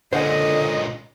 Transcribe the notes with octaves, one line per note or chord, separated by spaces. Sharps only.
C#2 A#2 D3 C5 D#5 F#5 G#5